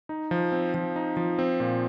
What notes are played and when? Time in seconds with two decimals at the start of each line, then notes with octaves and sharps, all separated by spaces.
0.09 D#4
0.31 F3
0.52 C4
0.74 F3
0.96 D#4
1.17 F3
1.39 C4
1.60 A#2